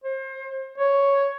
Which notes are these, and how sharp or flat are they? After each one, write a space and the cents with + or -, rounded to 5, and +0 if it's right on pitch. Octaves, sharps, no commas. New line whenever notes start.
C5 +35
C#5 +5